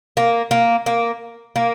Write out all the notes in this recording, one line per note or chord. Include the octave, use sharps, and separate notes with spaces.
A#3
A#3
A#3
A#3